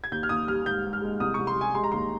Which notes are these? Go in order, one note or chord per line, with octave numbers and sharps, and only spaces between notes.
G#6
D#2 G6
F6
D#2 D#6
G3 F6
G#2 G6
G#2
F6
G#3
C2 D#6
C#6
C2
C6
G3 G#5
G#3 C6
A#5
D#2 C6